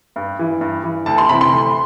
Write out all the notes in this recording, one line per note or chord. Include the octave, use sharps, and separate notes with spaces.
G2
E3
G2
E3
D2 A5
C6
C3 E3 B5
C6
D2